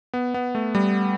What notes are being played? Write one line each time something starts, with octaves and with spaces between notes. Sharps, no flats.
B3
B3
A3
G3